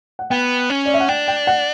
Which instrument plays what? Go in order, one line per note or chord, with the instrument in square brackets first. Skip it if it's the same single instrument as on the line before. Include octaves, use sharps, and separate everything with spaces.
[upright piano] F#5
[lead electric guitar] B3 [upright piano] G5
[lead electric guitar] C#4
[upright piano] D5
E5
F#5
[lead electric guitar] D4 [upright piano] G5
[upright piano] G5
F#5